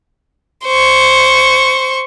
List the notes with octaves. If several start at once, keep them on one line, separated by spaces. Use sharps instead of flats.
C5 C#6